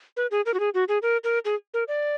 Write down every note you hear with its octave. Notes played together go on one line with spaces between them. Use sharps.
B4
G#4
A#4
F#4
G#4
F#4
G#4
A#4
A#4
G#4
A#4
D5